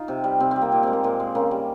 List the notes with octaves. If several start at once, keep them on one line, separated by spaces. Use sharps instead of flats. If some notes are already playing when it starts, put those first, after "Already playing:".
Already playing: D#4 F4
C3
G3
C3 C4
G3 C4
A#3
A#2
G#3 C4
A#3
A#2 C4
G#3
C#3 A#3
G3